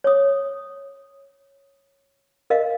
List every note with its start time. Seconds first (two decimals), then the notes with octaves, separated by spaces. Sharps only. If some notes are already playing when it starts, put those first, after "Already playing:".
0.04 C#5 D#6
2.50 A#4 D#5 F5